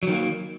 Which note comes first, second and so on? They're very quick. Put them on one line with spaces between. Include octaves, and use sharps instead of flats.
F#3 D#3 A#3